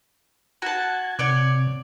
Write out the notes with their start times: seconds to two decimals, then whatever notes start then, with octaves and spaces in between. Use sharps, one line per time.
0.62 F#4 A5 G#6
1.19 C3 C#5 D5 G6